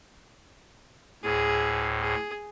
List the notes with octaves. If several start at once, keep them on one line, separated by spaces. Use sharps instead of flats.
D2 A2 G#4
G#4